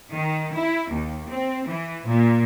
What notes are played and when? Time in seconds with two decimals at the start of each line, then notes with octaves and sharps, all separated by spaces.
0.13 D#3
0.54 E4
0.90 D#2
1.29 C4
1.66 E3
2.06 A#2